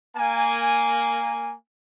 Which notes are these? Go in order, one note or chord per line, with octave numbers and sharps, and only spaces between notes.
A#3 G#5